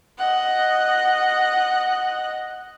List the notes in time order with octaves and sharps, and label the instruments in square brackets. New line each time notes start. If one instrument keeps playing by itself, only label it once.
[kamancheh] D#5 F#5